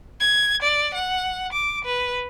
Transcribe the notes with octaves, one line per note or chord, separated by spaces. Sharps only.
G#6
D5
F#5
D6
B4